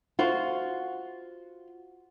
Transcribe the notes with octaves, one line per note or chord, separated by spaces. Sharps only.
F4 F#4 C5